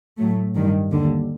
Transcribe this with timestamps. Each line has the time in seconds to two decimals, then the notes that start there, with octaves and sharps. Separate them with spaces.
0.18 A2 F#3 A3
0.54 G2 D#3 G3
0.91 D#2 D3 G3